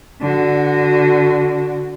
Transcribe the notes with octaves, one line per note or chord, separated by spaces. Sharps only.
D3 F#4